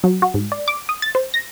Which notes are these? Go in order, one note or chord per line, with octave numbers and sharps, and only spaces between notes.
F#3
F#4
G#2
D5
D6
D#6
A6
C5
A#6